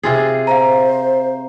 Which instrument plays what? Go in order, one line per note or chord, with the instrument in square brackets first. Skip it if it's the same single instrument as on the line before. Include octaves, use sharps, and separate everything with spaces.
[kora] C3 F4 G#4
[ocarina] C5 [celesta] F5 A#5